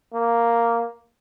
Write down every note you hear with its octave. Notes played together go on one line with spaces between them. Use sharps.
A#3